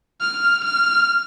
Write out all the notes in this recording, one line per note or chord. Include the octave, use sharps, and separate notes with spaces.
F6
F6